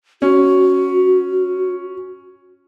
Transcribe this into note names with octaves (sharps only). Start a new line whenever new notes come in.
C#4 F#4